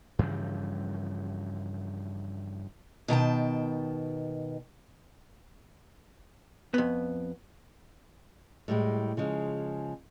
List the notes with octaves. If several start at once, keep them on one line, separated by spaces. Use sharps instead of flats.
G2 C#3 E3 F3
B2 D#3 G5 A5
F2 B3
A2 G3 G#3
C#3 F3 G#3